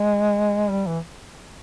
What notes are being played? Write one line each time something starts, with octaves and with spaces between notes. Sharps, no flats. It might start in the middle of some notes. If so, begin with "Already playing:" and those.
Already playing: G#3
G3
E3